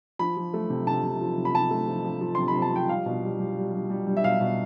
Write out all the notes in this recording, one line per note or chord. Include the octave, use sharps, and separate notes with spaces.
F3 B5
F3
A3
C3
C3 A5
C3
F3
C3
B5
C3 A5
A3
F3
F3
F3
C3 C6
B5
C3
A5
F3 G5
G3 F5
B2
G3
G3
G3
G3
G3
G3
E5
B2 F5
B2